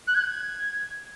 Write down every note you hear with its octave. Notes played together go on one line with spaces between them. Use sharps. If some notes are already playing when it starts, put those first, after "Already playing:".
F#6
G#6